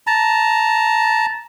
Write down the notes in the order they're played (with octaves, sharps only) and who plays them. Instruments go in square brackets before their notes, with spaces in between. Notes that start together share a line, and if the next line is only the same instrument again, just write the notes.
[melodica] A5 A#5